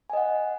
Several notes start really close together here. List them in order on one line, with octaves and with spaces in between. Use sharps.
G#5 D#5 F#5